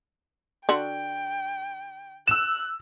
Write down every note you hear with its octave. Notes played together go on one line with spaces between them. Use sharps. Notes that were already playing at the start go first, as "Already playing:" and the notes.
D3 F#4 G5
E6 F#6 E7